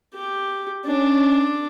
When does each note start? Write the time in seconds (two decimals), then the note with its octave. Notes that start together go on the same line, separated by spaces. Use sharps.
0.14 G4
0.85 C#4 D4